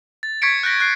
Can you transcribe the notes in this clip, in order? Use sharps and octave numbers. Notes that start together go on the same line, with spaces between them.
A6
C#6 G#6 B6 C#7 D7
F#6 G6 A#6 B6
F#6 C7